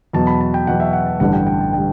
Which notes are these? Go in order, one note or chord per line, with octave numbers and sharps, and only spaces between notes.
E2 B2 F#3 A5
B5
A5
G5
E2 B2 F#3 F#5
E5
F#5
A5
A1 G2 D3 G3 F#5
G5
G5
A5
D3 G3 G5